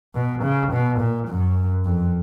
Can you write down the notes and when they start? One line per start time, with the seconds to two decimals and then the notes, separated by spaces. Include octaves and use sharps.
0.15 B2
0.43 C#3
0.72 B2
1.00 A#2
1.29 F#2
1.85 F2